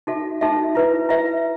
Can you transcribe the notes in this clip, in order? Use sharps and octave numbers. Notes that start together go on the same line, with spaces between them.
D#4 F#4 A4 E5
D#4 F#4 A4 E5
E4 B4 E5
E4 B4 E5